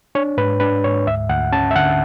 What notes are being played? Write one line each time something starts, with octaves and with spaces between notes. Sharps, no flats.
D4 C#5
G#2 B4
D4 B4
G#2 C#5
D2 E5
D2 F#5
C#4 A5
E5
D3 F#5